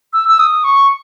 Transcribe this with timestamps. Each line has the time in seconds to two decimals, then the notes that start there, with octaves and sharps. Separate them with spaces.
0.13 E6
0.29 E6
0.39 D#6
0.64 C#6